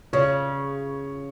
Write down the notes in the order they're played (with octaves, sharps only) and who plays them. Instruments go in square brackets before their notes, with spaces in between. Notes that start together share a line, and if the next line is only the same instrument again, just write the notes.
[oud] C#3 [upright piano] C#5